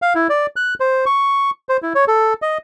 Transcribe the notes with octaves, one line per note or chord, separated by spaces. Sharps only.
F5
E4
D5
F#6
C5
C#6
C5
E4
C#5
A4
D#5